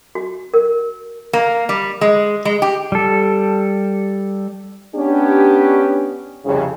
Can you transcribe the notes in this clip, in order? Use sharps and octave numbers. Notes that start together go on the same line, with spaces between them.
F#4
A#4
A#3
G3
G#3
G#3
G4
G3 A4
B3 C#4 D4 G4
C2 F2 C#3